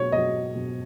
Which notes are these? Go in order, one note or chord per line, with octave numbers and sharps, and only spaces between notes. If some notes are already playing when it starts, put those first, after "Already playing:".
Already playing: B2 F#3 C#5
B2 F#3 D#5
B2 F#3